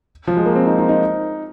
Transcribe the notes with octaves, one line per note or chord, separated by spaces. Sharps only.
F3
G#3
A#3
C4
D#4
D#4
D#4